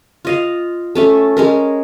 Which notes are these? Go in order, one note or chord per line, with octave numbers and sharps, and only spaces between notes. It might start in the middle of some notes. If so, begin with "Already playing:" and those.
F4 D#5 F5
A3 C#4 A4
G#3 C#4 A#4